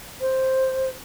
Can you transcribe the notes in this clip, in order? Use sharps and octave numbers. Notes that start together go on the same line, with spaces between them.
C5